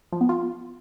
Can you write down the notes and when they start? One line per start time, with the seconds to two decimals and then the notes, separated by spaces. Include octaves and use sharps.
0.12 F3
0.21 B3
0.29 F4